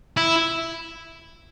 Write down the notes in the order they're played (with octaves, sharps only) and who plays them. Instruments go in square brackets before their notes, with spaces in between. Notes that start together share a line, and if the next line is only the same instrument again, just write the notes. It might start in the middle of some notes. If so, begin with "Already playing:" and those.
[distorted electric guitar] E4